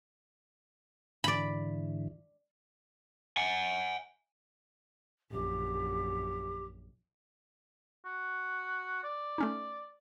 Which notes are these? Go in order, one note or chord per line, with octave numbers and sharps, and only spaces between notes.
G#2 D3 E3 D5 B5
F#5 G#5
A#1 F#2 G4
F#4
D5
A3 C#4 D#4